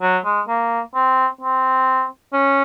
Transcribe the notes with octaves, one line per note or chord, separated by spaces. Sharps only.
F#3
G#3
A#3
C4
C4
C#4